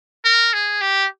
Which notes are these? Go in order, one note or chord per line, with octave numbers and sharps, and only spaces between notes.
A#4
G#4
G4